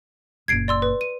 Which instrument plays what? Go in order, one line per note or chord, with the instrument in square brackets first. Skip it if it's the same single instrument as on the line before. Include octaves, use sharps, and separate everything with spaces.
[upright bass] F#1 A#2 [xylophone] G#6 C7 D7
[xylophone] D5 C6 E6
B4
D#7